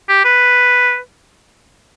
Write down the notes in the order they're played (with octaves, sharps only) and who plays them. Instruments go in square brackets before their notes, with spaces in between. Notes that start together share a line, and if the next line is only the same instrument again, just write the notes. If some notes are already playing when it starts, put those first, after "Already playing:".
[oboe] G4
B4